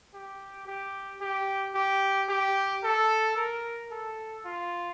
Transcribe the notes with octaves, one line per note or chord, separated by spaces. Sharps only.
G4
G4
G4
G4
G4
A4
A#4
A4
F4